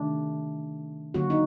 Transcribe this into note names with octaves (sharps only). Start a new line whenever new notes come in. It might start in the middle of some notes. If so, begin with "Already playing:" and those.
Already playing: C3 D#3 A3 D4
D3 F#3 A#3 F#4
D#4